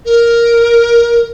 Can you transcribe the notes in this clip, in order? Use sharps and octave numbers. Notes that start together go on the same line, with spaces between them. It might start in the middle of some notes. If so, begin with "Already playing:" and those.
A#4